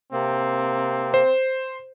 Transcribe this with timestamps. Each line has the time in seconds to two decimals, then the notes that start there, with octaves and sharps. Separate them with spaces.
0.12 C3 A#3 C4
1.14 C5